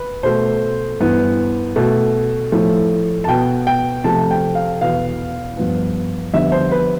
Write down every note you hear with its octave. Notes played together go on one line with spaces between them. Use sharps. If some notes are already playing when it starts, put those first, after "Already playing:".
Already playing: B4
B2 A3 C5
G2 E3 B3
B2 A3
A2 F3 A3
A5
B2 B3 G5
G5
C3 F3 A3 A5
G5
F5
E2 B2 B3 F5
G2 F3 B3
F2 D3 G3 B3 E5
C5
B4